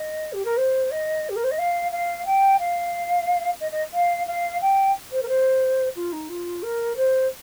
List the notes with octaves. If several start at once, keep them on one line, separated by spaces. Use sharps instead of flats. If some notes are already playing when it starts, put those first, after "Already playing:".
Already playing: D#5
G4
A#4
C5
D#5
G4
A#4
C5
D#5
F5
F5
G5
F5
D#5
D#5
F5
F5
G5
C5
A#4
C5
F4
D#4
F4
A#4
C5